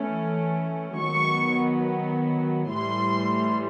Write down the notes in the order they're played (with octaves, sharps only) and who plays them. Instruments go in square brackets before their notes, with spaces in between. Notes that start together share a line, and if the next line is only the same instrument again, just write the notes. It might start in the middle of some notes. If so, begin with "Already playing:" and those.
Already playing: [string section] E3 A3 C#4
D#3 F#3 B3 C#6
A2 E3 G3 C6